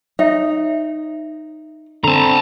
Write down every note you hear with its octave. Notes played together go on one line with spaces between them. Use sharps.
D#4 C#5 E5
D3 C4 A5 A#5